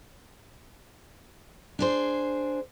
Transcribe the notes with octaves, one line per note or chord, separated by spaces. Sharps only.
D4 G#4 C5